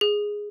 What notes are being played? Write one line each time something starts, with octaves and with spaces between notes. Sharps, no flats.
G#4